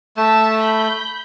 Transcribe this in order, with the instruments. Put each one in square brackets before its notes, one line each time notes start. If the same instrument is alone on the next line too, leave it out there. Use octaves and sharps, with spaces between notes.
[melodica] A3 [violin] A5 B6
[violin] B5 G6